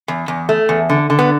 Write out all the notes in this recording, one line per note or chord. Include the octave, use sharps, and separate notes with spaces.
E2
E2
A3
E2
D3
D3
B3